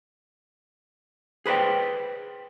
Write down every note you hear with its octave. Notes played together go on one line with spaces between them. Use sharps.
G#4 B4 C5 D5 G5